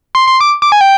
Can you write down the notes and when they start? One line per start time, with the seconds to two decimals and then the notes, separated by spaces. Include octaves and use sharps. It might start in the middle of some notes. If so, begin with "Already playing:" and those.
0.15 C6
0.27 C6
0.41 D6
0.62 D6
0.72 G#5
0.81 G5